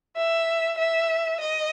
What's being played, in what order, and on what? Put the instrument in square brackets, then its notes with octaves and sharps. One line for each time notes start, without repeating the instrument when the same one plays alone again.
[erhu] E5
E5
D#5